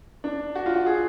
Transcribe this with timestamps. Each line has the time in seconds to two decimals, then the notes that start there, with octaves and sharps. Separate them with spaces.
0.24 D4
0.55 F#4
0.66 F4
0.75 F#4
0.86 G#4